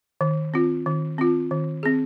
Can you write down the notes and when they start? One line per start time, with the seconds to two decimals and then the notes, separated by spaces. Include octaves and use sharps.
0.21 D#3
0.54 C4 F4
0.86 D#3
1.18 C4 F4
1.51 D#3
1.83 C4 G#4